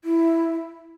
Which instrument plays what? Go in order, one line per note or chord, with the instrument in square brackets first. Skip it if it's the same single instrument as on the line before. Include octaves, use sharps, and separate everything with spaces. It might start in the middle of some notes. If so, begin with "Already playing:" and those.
[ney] E4